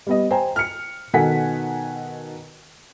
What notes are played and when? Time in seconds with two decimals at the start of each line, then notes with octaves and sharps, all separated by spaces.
0.07 G3 B3 D#5
0.31 C5 G5 G#5 A#5
0.56 F6 C#7
1.13 B2 D#3 A4 F#5 G#5 B6